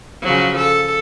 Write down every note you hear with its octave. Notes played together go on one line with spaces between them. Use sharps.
C#3 F3 F#3
A4